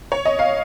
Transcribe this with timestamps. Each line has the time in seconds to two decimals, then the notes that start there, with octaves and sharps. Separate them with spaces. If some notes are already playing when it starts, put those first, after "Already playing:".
0.12 C#5
0.25 D#5
0.39 F5